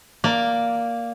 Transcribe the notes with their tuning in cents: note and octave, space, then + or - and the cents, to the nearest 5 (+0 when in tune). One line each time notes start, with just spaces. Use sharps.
A#3 +0 D5 +0